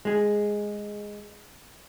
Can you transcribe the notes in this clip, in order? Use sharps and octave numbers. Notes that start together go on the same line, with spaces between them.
G#3 G#4